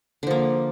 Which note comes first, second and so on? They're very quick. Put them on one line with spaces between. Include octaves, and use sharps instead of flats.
D3 F3 A#3